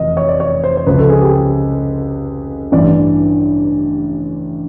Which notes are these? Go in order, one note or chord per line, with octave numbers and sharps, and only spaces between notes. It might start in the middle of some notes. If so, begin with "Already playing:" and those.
Already playing: F1 E2 D#5
C#5
D5
C#5
C5
C5
C#2 C#3 F3 B4
A4
G#4
G4
G#4
A1 G2 E3 D5